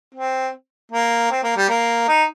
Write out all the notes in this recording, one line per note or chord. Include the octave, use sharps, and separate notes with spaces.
C4
A#3
C4
A#3
G3
A#3
D#4